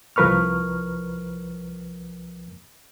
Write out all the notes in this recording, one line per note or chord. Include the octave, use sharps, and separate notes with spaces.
C2 F3 A#4 B4 C#6 F6